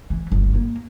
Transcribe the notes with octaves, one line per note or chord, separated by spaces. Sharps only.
E3
D1 G1
A#3